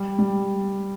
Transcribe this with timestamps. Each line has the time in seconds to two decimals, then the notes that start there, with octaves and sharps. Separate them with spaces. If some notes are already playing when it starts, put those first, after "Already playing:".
Already playing: G3
0.19 G3